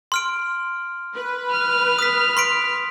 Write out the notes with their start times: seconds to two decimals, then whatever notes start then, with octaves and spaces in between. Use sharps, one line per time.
0.12 C6 F6 D7
1.15 B4
1.51 F6
1.99 D#6 B6
2.37 C6 B6 D7